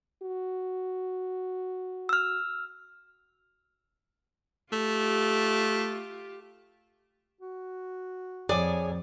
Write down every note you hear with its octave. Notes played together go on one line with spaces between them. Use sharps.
F#4
E6 F6
A3 F4 G4
F#4
F2 G#4 C#5 D5 G#5